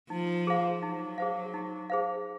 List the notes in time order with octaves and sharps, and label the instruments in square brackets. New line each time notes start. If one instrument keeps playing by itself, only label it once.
[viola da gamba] F3 [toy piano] D#4
[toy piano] G#4 C5 F5
[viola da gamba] F#3 [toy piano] D#4
[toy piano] G#4 C5 F5
D#4
G#4 C5 F5